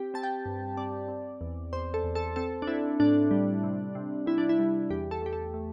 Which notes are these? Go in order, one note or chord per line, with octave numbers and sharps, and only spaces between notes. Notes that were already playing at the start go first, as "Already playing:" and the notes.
Already playing: C4 G4
C4 A5
G5
G2
C4 D5
C4
E2
E2 C5
A4
E2
A4
C4 A4
D4
C4 E4
A2 D4
G3
C3
C3
C3 E4
D4
E4
G3
E2 G4
A4
A3 G4
A4
A3